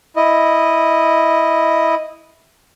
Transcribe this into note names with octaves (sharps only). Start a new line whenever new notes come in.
E4 D#5